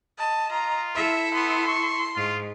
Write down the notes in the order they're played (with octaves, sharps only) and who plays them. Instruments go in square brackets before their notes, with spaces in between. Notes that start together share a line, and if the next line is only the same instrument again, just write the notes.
[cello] D#5 [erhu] A5
[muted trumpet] F4 [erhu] A#5
[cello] E4 A4 [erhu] E5
[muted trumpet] B3 [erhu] C6
[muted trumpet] C#6
[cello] G#2 [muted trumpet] F4